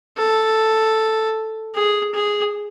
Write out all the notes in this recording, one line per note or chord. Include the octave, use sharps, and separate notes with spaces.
A4
G#4
G#4